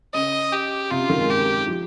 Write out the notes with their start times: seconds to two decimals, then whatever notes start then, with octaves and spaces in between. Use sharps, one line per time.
0.14 C#3 D#5
0.52 G4
0.91 C3 F4
1.00 C#3
1.09 D#3
1.20 G#3
1.30 G4
1.67 F3